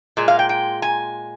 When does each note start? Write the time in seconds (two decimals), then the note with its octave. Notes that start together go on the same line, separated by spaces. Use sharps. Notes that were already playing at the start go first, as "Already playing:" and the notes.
0.17 A#2 G#3
0.28 F5
0.39 G5
0.49 G5
0.82 G#5